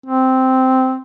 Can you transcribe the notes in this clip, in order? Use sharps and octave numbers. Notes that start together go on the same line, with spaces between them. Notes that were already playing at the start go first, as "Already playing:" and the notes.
C4